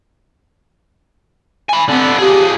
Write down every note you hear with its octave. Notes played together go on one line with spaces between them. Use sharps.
G#5 B5
D3 B3 C4
F3 G4 G#4